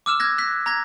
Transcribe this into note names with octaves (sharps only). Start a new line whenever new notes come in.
D6 E6 F6 E7
F#6 G#6 A#6
F#6 B6
A#5 G#6 A#6